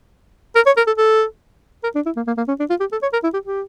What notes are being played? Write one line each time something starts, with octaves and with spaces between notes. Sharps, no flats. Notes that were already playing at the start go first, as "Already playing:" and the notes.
A#4
C#5
A#4
A4
A4
A#4
D4
E4
A#3
A#3
A#3
C#4
D4
F4
G4
A4
C#5
A#4
E4
G4
G4